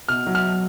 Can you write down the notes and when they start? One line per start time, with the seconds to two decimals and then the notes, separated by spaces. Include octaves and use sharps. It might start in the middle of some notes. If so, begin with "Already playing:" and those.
0.09 B2 F6
0.27 F#3
0.35 F6